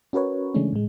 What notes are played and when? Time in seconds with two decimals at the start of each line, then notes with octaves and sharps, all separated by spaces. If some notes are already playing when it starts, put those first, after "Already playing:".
0.13 C#4 F#4 A#4 B4 C#5
0.54 C#3 E3 G#3 A3 C#4 D4
0.73 A2 G#3